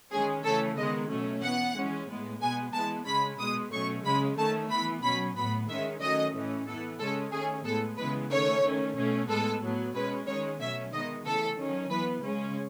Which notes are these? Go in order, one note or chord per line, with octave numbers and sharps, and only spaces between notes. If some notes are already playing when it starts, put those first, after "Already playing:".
D#3 G#3 C#4 G#4
C#3 E3 A3 C#4 A4
D#3 G#3 B3 D#5
B2 F#3 A3 C#4
E3 B3 F#5
E3 G#3 C#4
A2 G#3 B3
B2 G#3 B3 G#5
E3 G#3 B3 A5
C#3 G#3 C#4 B5
B2 G#3 B3 D#6
B2 F#3 A3 C#4 C#6
C#3 G#3 C#4 B5
D#3 A3 C#4 A5
E3 B3 B5
B2 F#3 C#4 B5
A2 F#3 B3 B5
D#3 G#3 C#4 E5
D#3 F#3 A3 C#4 D#5
A2 E3 A3 C#4
E3 B3 A4
C#3 G#3 C#4 A4
D#3 A3 C#4 G#4
A2 G#3 B3 A4
C#3 E3 G#3 B3 B4
D#3 A3 C#4 C#5
D#3 A3 C#4
B2 A3 C#4
A2 G#3 B3 A4
A2 F#3 B3
B2 G#3 C#4 B4
D#3 G#3 C#4 C#5
B2 F#3 A3 C#4 E5
D#3 G#3 B3 D#5
C#3 E3 A3 A4
D#3 F#3 C#4
E3 B3 B4
C#3 G#3 C#4